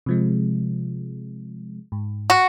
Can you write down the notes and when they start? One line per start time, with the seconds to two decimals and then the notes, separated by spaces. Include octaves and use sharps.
0.06 C3 F3 G#3
1.92 G#2
2.30 F#4